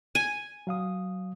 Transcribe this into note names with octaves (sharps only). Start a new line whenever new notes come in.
G#5
F#3 F5 D#6